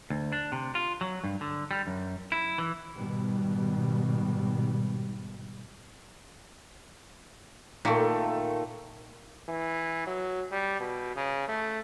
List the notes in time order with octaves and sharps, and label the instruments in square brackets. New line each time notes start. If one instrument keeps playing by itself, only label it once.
[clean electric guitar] D2
D4
C3
F4
F#3
G2
D3
G3
F#2
E4
E3
[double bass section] G#2 B2 D#3 G3
[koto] A#2 [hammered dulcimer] D#3 A3
[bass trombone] E3
F#3
G3
B2
C#3
A3